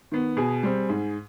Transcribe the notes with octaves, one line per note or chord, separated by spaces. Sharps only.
D#3 B3
B2 G#4
G3 C4
G#2